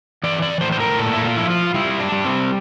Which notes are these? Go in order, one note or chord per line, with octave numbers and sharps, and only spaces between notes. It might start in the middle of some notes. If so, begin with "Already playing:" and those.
E3 D5
D5
A2 C5
C5
A#4
A#2 A4
E4
F4
F3 E4
F4
G3 E4
D4
G3
C4